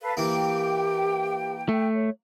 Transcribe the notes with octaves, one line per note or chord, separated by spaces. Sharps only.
A4 B4 F5
E3 A#3 G4 G5
A3
C#5